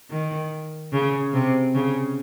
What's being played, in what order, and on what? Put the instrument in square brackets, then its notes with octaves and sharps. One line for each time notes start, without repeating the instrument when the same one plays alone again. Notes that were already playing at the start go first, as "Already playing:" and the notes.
[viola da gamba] D#3
C#3
C3
C#3